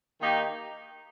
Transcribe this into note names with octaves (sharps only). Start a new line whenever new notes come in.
D#3 A#3 D#4 G4